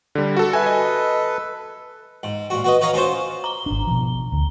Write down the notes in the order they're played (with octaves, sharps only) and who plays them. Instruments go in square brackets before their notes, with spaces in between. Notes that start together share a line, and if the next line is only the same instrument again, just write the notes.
[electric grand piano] D3 G3
F#4 A4
[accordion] A4 B4 [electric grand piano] E5 G#5
[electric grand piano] D#5
[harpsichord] G#2
A#2 F#4
F#4 B4 D#5
B4 C#5 D#5 F5 A#5
C#4 F4 F#4 C5
[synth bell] A#5 G7
[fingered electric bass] G#1 D4
B2 F3
D2